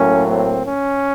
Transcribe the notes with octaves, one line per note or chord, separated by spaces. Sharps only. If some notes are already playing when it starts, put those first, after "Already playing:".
Already playing: A2 F#3 A#3 C#4
C4
C#4